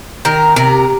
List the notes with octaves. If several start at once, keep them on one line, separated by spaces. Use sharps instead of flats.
D#3 A#4
C3 A#4